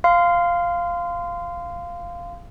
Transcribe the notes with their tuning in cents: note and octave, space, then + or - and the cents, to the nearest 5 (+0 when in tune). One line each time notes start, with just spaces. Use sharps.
F5 -5 C6 -25